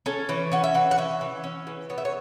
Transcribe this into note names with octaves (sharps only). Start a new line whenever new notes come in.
C#4 A4
E3 C#5
C#4 F#5
E5
E3 F#5
F#5
C#4 E5
E3
C#4
E3
B3 C#5
E5
C#5